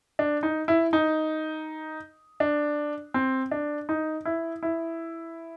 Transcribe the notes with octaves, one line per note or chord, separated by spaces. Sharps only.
D4
D#4
E4
D#4
D4
C4
D4
D#4
E4
E4